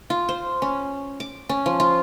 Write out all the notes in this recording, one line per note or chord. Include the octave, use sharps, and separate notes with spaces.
F4
C5
C#4
D6
C#4
F3
F4